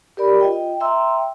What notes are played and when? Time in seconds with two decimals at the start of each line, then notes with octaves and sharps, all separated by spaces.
0.17 G4 A#4 D5 B5
0.41 F4 D#5 G5
0.80 E5 G5 A#5 C6 E6